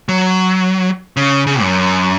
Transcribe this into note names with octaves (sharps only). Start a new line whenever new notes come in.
F#3
C#3
C#3
F#2